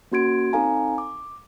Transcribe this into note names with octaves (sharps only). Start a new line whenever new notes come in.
A#3 C#4 F#4 C6 G#6 D7
C4 D#4 A4 F5 G#5 A#5
D6